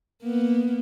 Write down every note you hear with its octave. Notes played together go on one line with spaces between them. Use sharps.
A#3 B3